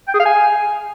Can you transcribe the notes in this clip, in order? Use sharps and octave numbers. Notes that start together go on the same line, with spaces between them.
G5
G#4
F5
G#5